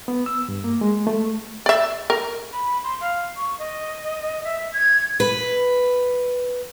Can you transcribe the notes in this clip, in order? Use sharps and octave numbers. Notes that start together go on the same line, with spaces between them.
B3
E6
G2
A#3
G#3
A3
D5 E5
A#4
B5
C6
F5
C#6
D#5
E5
G#6
B4